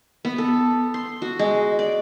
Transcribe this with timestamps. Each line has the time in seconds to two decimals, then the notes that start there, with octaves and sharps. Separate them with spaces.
0.25 B3
0.38 A4
0.94 C6
1.22 F#4
1.39 G#3
1.79 D5